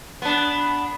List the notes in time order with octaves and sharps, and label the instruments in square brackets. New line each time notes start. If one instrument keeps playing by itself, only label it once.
[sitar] B3 D4